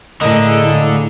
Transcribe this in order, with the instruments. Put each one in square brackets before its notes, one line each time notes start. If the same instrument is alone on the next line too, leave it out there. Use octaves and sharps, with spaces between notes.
[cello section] A2 [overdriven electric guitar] D3 D4 [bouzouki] A#3 G#4 A4 [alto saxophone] D#5